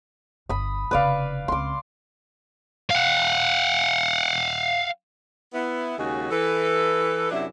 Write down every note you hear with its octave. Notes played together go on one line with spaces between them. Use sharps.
G1 B5 D#6
F1 C#3 B4 D5 F5
C#2 C4 C6 D6
F5 F#5
B3 E4
D#2 C#3 G#3 C#4 F#4 G#4
E3 A4 B4
F#2 C3 F#3 D4 E4